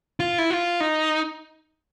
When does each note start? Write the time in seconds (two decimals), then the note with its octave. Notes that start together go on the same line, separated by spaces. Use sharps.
0.20 F4
0.38 E4
0.50 F4
0.80 D#4